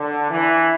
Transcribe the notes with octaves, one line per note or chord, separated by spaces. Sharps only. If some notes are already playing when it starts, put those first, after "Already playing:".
Already playing: D3
E3